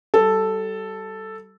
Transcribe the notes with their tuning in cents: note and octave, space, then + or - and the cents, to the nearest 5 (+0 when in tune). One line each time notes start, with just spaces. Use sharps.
G3 -25 A4 +0